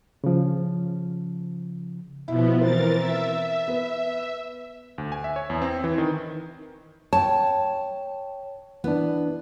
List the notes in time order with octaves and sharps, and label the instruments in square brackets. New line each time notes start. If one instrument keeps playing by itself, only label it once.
[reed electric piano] C#3 F3
[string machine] B2 F3 B3 [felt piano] E4
[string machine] E3 A#4 A6 [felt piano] C4 C5
[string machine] E5
[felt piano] B3
[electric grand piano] D2
G#5
E5
C#5
E2
C4
E3
D#3
[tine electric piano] C#5 G5 [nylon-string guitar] A5
[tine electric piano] E3 D4 [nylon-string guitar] B3